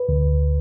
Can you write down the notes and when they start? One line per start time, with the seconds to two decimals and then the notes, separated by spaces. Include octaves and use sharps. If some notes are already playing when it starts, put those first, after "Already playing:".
Already playing: B4
0.09 D2